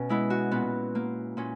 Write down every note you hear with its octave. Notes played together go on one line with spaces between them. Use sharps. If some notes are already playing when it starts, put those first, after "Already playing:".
Already playing: B2 C#4
G#3 B3 E4
F#4
A#2 B3
A#3
A#2 C#4